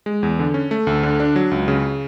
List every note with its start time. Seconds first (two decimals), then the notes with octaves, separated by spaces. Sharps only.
0.06 G#3
0.23 E2
0.39 D3
0.54 C#4
0.71 A3
0.87 D2
1.03 D3
1.20 D4
1.36 F#3
1.51 C#2
1.68 C#3